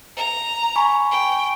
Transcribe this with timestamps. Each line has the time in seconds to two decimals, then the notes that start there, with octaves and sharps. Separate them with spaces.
0.16 A#5
0.76 G#5 B5 C#6
1.11 G5